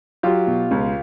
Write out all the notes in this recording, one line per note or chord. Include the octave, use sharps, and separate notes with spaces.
F#3 F4 G4
B2
C#2